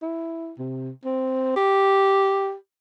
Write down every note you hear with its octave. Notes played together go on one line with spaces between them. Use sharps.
E4
C3
C4
G4